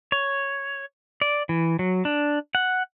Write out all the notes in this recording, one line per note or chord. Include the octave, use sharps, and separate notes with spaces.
C#5
D5
E3
F#3
D4
F#5